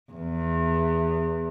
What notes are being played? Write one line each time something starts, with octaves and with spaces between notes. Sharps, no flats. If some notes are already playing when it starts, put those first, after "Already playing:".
E2